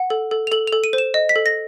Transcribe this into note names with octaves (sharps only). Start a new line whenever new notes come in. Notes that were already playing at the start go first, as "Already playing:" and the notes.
Already playing: F#5
A4
A4
F7
A4 F#7
F7
A4
D#7
C5
E7
D#5
B6
A4
A#6